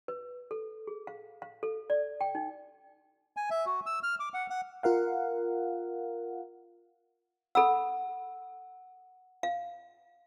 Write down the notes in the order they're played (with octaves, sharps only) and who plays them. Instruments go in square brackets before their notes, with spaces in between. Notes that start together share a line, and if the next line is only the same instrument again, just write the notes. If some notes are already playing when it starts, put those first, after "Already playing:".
[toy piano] B4
A4
G#4
F5
F5
A4
D5
G5
D#4
[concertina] G#5
E5
F#4
E6
F6
D6
F#5
F#5
[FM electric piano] F4 A#4 F5 F#5
[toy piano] A4 B5 E6 [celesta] F#5
[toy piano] F5